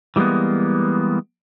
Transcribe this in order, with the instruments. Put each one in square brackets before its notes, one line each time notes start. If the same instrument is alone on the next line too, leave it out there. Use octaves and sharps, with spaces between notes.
[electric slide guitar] E3 G3 G#3 A#3 B3